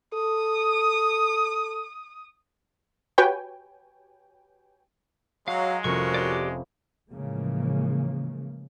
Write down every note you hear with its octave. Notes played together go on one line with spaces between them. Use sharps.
A4 D#6
F#4 G4 B4 C#5 G5 G#5
F#3 G#3 F5
F1 F3 C#4 F#4 A#4 C#6
G4 D5
A2 C#3 E3 F3 G#3 A#3